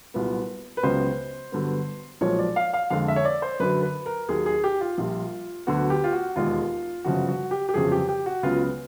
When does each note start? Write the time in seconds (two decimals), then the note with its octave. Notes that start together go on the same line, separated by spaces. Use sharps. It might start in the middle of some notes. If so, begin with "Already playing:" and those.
0.14 C2 A#2 F#3 B3
0.77 B4
0.83 C#2 C#3 F#3 B3 C5
1.52 G2 D3 F#3 B3
2.21 B1 A#2 F3 G#3 C#5
2.39 D5
2.56 F5
2.74 F5
2.90 F2 D3 F3 G#3 F5
3.08 E5
3.16 C#5
3.25 D5
3.42 C5
3.60 F#2 D3 F#3 B4
3.82 B4
4.06 A#4
4.29 D#2 D#3 F#3 G#4
4.46 G#4
4.64 G4
4.81 F4
4.98 A#1 A#2 G3
5.67 D2 D3 F#3 B3 F#4
5.90 G4
6.04 F4
6.13 F#4
6.36 E1 D#2 D#3 G#3 F4
7.05 G1 F#2 C#3 F3 F#4
7.28 F#4
7.51 G4
7.69 G4
7.74 G1 F2 C#3 F#3 G#4
7.92 G4
8.09 G4
8.26 F#4
8.43 C#2 C#3 F#3 B3 F4